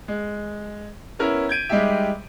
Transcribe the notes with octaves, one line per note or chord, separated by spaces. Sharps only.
G#3
B3 C#4 E4 A#4
G6 G#6 D7 D#7
G3 G#3 D#4 G4 E5